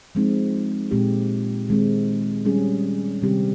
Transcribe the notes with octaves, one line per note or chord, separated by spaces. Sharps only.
F3 G#3 C4 D#4
A#2 G#3 C4 G4
D#3 G#3 C4
G3 C#4 G#4
C3 D#3 G3 C4 G4